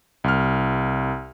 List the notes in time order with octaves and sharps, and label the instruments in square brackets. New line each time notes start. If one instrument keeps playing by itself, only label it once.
[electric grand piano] C2 F6